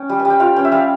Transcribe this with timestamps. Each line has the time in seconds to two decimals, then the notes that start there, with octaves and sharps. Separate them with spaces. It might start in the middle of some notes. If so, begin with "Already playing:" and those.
Already playing: C#4 G5
0.09 G3
0.20 G#5
0.25 G3
0.30 G5
0.40 F4 F5
0.56 C#4 G5
0.65 E5
0.72 G3 F5